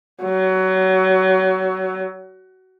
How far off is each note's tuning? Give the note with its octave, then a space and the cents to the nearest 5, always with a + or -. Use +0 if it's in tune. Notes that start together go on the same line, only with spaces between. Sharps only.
F#3 +25